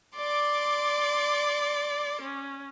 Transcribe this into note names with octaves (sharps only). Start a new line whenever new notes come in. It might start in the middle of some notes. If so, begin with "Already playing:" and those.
D5 C6 D6
C#4